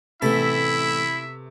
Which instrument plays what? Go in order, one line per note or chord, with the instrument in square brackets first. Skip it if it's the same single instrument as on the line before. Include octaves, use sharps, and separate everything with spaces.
[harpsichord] A1 A4 [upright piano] C3 A3 B3 [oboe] E4 [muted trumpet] E5